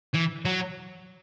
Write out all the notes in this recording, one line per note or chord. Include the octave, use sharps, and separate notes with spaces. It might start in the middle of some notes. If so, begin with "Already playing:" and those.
E3
F#3